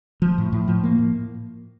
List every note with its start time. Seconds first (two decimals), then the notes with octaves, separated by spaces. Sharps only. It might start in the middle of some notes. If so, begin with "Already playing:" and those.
0.22 F3
0.38 A2
0.52 A2
0.68 F3
0.83 A#3
0.99 A2